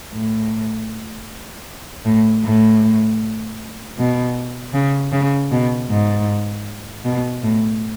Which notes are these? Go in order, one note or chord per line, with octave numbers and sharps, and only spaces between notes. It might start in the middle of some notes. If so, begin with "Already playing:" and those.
A2
A2
A2
B2
C#3
C#3
B2
G#2
B2
A2